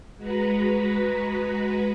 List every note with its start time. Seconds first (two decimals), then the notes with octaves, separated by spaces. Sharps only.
0.17 G#3 F#4 B4 A#5 B5